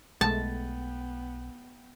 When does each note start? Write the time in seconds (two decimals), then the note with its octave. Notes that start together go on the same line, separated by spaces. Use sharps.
0.21 B1 G#3 A3 B3 G5 A5